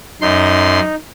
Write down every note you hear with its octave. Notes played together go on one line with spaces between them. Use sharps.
F#2 D#4 C6